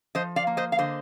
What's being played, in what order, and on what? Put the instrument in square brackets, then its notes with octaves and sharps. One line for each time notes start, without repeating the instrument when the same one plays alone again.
[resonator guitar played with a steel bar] F3 C5 D#5
D5 F5
A#3
C5 D#5
F5
D3 C5 D#5